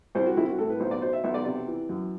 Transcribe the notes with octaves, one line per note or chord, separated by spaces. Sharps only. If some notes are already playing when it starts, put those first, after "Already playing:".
C2 C5
F#4
C2 E4
F#4
A2 A4
B4
B1 C5
D5
B2 C5
E5
B1 E5
D5
C3 D5
E3
F#2